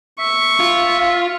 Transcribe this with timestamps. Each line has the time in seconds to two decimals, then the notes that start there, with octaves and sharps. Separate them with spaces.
0.19 E5 C#6
0.60 F4